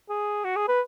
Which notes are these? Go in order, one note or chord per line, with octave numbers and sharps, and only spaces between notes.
G#4
F#4
G#4
B4